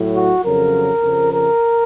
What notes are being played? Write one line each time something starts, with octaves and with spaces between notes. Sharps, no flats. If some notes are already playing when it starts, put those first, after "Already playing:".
Already playing: A2 F#3
F#4
F2 C#3 F#3 A#4
F2 C#3 F3
A#4